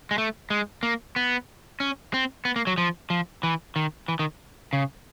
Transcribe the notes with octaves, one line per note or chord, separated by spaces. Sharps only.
G#3
A3
G#3
A#3
B3
C#4
C4
B3
A#3
F#3
F3
F3
E3
D#3
E3
D#3
C#3